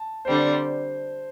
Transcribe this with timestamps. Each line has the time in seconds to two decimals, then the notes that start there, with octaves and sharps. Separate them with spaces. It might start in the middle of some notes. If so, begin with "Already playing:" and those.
Already playing: A5
0.25 D3 G3 C4 C5